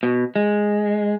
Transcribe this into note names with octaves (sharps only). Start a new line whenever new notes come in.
B2
G#3